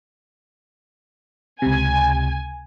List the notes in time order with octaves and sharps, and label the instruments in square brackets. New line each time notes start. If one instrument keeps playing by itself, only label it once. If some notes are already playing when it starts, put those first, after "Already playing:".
[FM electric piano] C#2 C3 [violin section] G#5